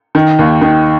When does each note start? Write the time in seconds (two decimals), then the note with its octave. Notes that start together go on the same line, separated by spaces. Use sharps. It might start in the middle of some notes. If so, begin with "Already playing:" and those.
0.15 D#3
0.39 D#2
0.61 D#3